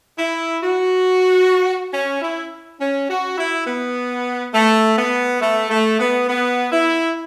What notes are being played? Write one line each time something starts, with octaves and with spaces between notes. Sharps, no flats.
E4
F#4
C#4
E4
C#4
F#4
E4
B3
A3
B3
A3
A3
B3
B3
E4